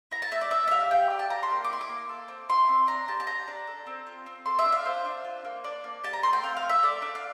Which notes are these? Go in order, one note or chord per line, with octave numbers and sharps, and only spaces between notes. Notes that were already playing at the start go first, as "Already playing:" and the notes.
E4 A#5
A5
A3 E5
D5
D4 E5
E5
G4 F5
G4 G5
D4
A5
G4 A#5
C6
A#3
D6
E4 C6
D6
A#3
A4
C4
E4 C6
C4
D4 A#5
G4 A5
A5
G4 A#5
D4
A4
C4
F4
C4
A4 C6
E5
D4
F5
F4 C5
D4
F4
A#3
D4 D5
A#3
G4 A5
A#5
A3 C6
G5
C4 F5
F5
A3
E5
A4 D5
D4 D5
F5